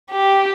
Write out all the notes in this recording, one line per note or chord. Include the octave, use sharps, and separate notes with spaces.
G4